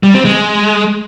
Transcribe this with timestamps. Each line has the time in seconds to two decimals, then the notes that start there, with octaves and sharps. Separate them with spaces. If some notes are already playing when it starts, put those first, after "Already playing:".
0.03 G3
0.14 C4
0.25 G#3